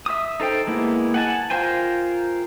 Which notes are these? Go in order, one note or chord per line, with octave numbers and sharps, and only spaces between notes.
E5 D#6
D#4 A4 C5 G5
G#3 A#3 B3 E4
F#5 G#5 A5
F4 A#4 C5 G5 G#5